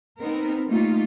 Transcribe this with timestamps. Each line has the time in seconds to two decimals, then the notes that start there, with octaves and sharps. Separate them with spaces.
0.20 B3 C4 D#4 A#4
0.66 G3 A3 A#3 D#4 F4